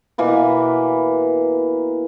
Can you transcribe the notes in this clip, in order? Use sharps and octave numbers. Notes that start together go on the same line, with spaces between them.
B2 E3 A#3 B4